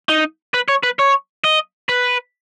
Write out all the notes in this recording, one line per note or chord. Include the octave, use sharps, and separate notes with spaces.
D#4
B4
C#5
B4
C#5
D#5
B4